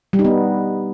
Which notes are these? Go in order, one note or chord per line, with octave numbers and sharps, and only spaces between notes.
G3
D#4
B3